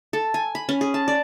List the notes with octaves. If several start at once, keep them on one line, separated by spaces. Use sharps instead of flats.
A4
G#5
B5
C#4
G#4
A5
D5